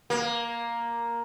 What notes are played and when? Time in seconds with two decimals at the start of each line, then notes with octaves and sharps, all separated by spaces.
0.10 A#3